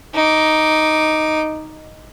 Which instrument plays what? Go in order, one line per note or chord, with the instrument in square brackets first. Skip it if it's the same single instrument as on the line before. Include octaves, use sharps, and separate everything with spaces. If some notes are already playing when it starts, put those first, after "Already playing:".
[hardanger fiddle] D#4 D6